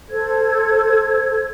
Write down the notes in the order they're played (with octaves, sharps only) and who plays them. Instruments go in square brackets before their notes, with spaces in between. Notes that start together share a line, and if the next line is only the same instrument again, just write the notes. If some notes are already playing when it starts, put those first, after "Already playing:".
[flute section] A4 C5 G#6